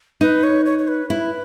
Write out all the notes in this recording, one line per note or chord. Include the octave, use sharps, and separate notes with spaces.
D#4 B4
C#5
C#5
C#5
B4
E4 B4